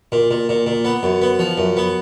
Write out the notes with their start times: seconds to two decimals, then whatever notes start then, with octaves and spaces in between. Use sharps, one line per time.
0.12 A#2
0.31 A#2
0.49 A#2
0.66 A#2
0.85 B3
1.03 F#2
1.22 B3
1.39 F3
1.58 F#2
1.77 B3